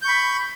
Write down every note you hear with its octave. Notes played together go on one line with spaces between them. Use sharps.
B5 C#6 G6